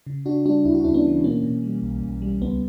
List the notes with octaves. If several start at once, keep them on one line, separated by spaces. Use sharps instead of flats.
C#3
C#3 D4 F#4
G3 D4 F#4
D2 E4
F#4
D2 C#4 E4
B3 D4
E3
B2 A#3 C#4
B2
G3
B1
B1
G3
C#2 B3